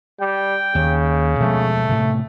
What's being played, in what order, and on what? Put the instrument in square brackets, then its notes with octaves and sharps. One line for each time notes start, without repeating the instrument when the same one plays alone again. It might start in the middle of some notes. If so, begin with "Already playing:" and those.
[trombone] G3 [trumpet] G5
[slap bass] D#2 [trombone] C#3
[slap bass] B2 F3 G#3 [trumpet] A3
[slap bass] A2 C3